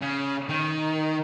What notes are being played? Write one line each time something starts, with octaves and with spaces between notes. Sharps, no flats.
C#3
D#3